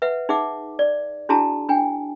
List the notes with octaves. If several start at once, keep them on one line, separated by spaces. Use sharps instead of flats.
B4 E5 F#5
D#4 G#4 E5 F#5 D6
D5
D4 E4 F#4 G#4 A5 A#5
D4 G5 G#5